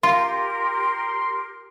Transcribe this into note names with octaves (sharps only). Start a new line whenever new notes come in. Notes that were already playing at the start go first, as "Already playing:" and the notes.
F4 G4 A#4 C6